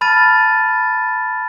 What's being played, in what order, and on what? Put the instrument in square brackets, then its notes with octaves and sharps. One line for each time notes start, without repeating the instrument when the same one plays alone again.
[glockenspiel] A5 B5 F6 A6 D#7